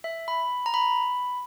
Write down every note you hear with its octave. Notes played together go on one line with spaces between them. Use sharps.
E5
B5
A#5
B5